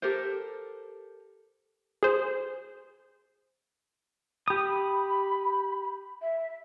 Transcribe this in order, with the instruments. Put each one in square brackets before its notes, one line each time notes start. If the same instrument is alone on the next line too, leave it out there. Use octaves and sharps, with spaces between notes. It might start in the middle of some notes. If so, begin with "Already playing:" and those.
[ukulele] G4 A4 A#4 C5
[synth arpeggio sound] G#4 C5
[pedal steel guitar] G4 D#6 [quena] B5
[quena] E5